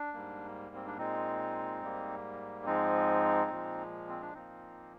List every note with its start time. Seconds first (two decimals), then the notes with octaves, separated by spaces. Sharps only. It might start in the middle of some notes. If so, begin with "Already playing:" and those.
Already playing: D4
0.14 G#2 G3 A#3
0.75 C4
0.87 D4
0.97 A#2 G#3 C4 D#4
1.82 G#2 G3 A#3
2.65 G#2 F3 G#3 C4 D#4
3.50 A#2 F3 G#3
4.09 C4
4.21 D4
4.34 A#2 F3 A#3 C4 D#4